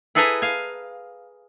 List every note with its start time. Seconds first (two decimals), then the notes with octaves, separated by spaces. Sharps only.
0.15 E4 G#4 A4 B4 G#5 A#5
0.42 F5 G#5